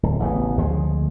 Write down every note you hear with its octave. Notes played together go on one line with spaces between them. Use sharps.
D1
A1 C#3 G3 B3
D2 F3 G#3